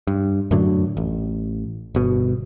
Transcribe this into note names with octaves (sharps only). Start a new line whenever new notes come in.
G2
F#2 A2 D3 F#3
A1
G1 B2